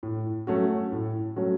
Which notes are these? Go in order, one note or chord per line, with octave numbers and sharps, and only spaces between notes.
A2
F#3 A3 C#4 F#4
A2
F#3 A3 C#4 F#4